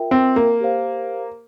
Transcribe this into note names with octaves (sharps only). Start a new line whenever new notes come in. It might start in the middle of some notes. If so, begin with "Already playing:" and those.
Already playing: F4 A#4 E5 G5
C4
A#3
G4 C5 F5